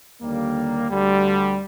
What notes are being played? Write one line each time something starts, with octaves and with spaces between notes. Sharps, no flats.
D#2 D3 G3 A#3
D2 D3 G3